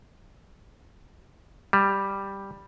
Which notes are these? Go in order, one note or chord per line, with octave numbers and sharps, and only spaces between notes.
G3